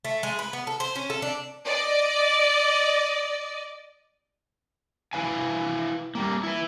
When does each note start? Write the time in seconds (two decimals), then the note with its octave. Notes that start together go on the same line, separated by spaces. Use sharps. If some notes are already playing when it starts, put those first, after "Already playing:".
0.05 A3
0.23 G#3
0.39 B4
0.53 B3
0.67 A4
0.80 C5
0.95 C#4
1.10 A4
1.22 D4
1.65 D5 D#5
5.13 E4 B4 F5 G#5
6.15 G3 A#3
6.44 E4 B4